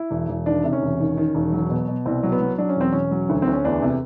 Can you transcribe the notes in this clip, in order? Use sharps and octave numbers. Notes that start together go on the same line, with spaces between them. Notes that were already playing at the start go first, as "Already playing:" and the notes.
Already playing: E4
E1
E1
D#3 D4
C3
C#4
E1
D#3
D#3
E1
F#3
B2
B2
C2 C4
F#3
B3
F#3
F#3 D4
C#4
E1 C4
E1 C#4
F#3
D2
D2 C4
C#4
E2 D4
C3